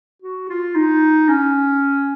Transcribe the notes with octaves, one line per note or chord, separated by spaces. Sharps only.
F#4
F4
D#4
C#4